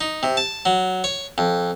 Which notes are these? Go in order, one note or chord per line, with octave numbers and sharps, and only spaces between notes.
D#4
C3
A5
F#3
C#5
F2